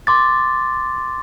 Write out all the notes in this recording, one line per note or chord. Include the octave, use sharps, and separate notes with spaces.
C6 D6 A6